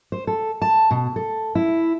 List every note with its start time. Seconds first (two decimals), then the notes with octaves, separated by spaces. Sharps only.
0.12 C5
0.27 A4
0.62 A5
0.91 B2
1.16 A4
1.55 E4